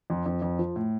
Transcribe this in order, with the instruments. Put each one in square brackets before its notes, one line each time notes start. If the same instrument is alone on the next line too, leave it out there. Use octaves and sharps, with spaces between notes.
[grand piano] F2
F2
F2
F3
A2